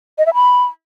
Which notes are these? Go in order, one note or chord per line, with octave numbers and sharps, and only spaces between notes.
D#5
E5
B5